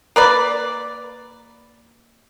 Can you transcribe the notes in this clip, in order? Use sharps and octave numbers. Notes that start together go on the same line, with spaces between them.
A#3 B4 D5